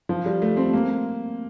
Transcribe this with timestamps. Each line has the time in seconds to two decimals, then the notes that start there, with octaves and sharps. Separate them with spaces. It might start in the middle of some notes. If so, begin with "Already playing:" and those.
0.09 F3
0.26 G3
0.42 A3
0.57 C4
0.73 A#3